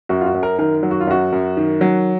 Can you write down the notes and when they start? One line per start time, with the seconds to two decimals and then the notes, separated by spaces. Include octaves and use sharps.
0.09 F#2 F#4
0.21 F4
0.26 F#4
0.34 F#2
0.43 A#4
0.58 D#3 A#4
0.83 F#3
0.91 F#4
1.00 F4
1.07 F#2 F#4
1.32 F#2
1.57 D#3
1.81 F#3